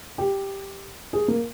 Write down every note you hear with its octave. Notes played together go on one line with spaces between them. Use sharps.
G4
G#4
A#3